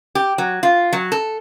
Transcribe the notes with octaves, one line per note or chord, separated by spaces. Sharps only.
G4
F#3
F4
F#3
A4